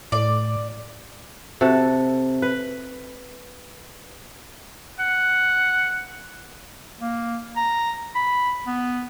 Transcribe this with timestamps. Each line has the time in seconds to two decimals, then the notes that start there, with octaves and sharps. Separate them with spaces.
0.12 A2 D5
1.61 C3 F#4 A4
2.42 B4
4.99 F#5
7.01 A#3
7.57 A#5
8.15 B5
8.67 B3